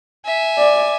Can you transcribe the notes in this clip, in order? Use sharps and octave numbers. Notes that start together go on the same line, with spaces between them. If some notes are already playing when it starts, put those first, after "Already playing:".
E5 G#5
D5